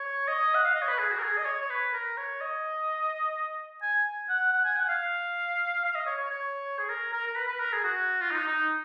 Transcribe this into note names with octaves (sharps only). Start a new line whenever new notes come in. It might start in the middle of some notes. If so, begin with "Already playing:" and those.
Already playing: C#5
D#5
F#5
F5
D#5
C#5
B4
G#4
F#4
A#4
G#4
D#5
C#5
C#5
B4
A#4
C#5
D#5
G#5
F#5
F#5
G#5
F#5
F5
F5
D#5
C#5
C#5
C#5
G#4
A#4
A#4
A#4
B4
B4
A#4
G#4
F#4
F4
D#4
D#4